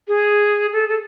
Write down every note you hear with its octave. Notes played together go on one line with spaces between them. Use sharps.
G#4
A4
A4